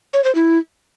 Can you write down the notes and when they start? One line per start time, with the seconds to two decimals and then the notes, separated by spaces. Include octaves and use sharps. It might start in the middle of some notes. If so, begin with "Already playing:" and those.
0.13 C#5
0.24 C5
0.35 E4